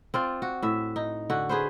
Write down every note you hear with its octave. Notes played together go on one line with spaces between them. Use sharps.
C4 F4 D5
F#4
A2 E5
D#4
D3 F#4
G#4 B4 C5